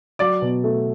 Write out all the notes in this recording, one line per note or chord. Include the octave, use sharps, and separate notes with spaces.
F#3 D5 D6
B2
A3